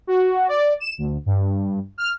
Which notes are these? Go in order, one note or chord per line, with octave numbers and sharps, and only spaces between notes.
F#4
D5
E7
D2
G2
F6